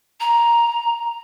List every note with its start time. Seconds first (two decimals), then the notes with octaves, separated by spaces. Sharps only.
0.20 A#5